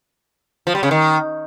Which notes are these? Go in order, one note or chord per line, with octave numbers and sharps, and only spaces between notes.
F3
G3
C#3
D#3